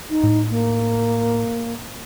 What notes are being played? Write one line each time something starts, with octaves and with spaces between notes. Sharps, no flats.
D#4
A2
A#3